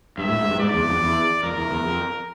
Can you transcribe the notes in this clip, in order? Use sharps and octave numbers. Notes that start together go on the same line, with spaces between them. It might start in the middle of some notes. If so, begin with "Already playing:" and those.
G2 E5
A2
G#2
G2
G#2 D5
E2
F2
E2
F2 A#4
E2
E2
F2